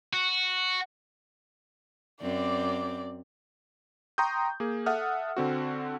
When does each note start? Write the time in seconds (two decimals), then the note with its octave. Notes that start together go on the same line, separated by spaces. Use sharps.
0.13 F#4
2.21 F#2 C4 D5 D6
4.18 G5 A#5 C6 C#6 D#6 G6
4.60 A#3 G#4
4.86 A4 E5 F#5 D#6 F6
5.37 D3 C4 F#4